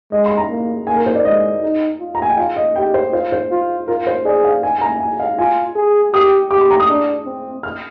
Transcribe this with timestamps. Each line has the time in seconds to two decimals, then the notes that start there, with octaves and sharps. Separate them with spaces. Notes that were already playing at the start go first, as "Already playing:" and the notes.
0.12 G#3 D#5
0.26 C6
0.37 A#5
0.50 A#3
0.87 A#3 G#5
0.96 A#4
1.06 C5
1.15 D5
1.25 G#3 D#5
1.62 D#4
2.00 F4
2.15 A#5
2.22 G#5
2.30 G5
2.37 F4 F5
2.56 D#5
2.76 G4 G5
2.94 C5
3.13 F4 C5
3.32 C5
3.51 F4
3.88 F4 A#4
4.07 C5
4.25 G#4 D5
4.44 F5
4.63 G#5
4.78 G#5
4.81 A#5
5.00 G#5
5.20 F5
5.39 F4 G#5
5.76 G#4
6.13 G4 D#6
6.51 G4 D6
6.61 C6
6.71 A#5
6.80 D#6
6.89 D4
7.26 C4
7.63 F6